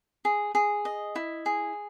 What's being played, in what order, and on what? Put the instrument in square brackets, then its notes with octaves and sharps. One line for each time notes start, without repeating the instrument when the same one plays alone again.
[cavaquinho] G#4
G#4
D#5
E4
G#4